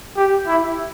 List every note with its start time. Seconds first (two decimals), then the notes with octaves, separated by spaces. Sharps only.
0.17 G4
0.47 E4